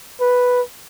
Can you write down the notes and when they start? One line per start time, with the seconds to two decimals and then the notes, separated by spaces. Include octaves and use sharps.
0.20 B4